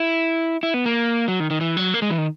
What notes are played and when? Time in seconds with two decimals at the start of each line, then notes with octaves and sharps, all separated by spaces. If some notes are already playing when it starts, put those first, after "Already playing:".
Already playing: E4
0.63 E4
0.74 B3
0.86 A#3
1.28 F#3
1.40 D#3
1.50 D#3
1.61 E3
1.77 F#3
1.94 A#3
2.02 G#3
2.10 E3
2.18 D#3